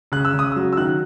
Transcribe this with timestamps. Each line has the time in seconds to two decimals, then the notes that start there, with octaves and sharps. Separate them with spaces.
0.12 C#3 F#6
0.25 E6
0.34 C#3
0.39 D#6
0.52 F#3 E6
0.73 E6
0.77 D#3 F#6